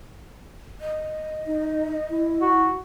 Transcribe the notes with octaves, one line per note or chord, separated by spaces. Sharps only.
D#5
D#4
E4
F#4